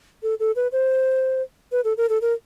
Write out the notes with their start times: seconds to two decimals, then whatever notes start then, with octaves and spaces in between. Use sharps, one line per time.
0.23 A4
0.40 A4
0.56 B4
0.72 C5
1.72 B4
1.84 A4
1.97 A#4
2.09 A4
2.21 A#4